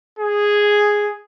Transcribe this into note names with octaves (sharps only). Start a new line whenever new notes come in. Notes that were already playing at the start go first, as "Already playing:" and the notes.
G#4